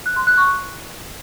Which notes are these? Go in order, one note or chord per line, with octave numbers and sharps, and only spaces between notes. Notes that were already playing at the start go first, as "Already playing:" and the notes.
F#6
C6
F#6
C#6